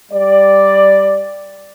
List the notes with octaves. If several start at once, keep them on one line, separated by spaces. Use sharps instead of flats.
G3 D5